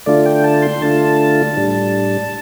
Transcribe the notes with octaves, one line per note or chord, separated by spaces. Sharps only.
D3 A3 D4 F4 D5
G5
A5
C6
D3 A3 D4 F4 A5
A2 G3 D4